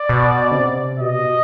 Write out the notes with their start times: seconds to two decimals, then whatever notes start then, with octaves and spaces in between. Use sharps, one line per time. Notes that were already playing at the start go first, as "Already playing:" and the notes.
Already playing: D5
0.09 B2
0.51 D3
0.55 C3
1.00 B2 D#5